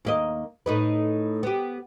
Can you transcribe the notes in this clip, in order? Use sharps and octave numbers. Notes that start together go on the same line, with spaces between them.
D#2 A#3 D#5
A2 D#4 B4
B3 G4